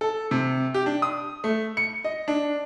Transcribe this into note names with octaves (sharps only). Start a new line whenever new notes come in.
A4
C3
G4
D4
D#6
A3
C#7
D#5
D4